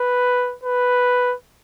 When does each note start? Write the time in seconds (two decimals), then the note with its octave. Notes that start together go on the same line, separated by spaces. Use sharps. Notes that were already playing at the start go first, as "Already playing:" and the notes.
Already playing: B4
0.63 B4